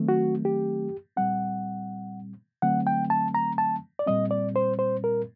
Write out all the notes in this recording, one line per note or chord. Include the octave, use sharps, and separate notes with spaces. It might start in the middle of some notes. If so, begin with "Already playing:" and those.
Already playing: D#3 F#3 A3 C4
F#4
G4
A#2 G3 C4 F#5
D3 F#3 A3 C4 F#5
G5
A5
A#5
A5
D5
A#2 G3 C4 D#5
D5
C5
C5
A#4